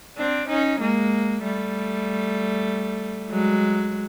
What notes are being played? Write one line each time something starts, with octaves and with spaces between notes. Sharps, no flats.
C4 D4
C#4 D#4
G#3 A#3
G3 A3
F#3 G#3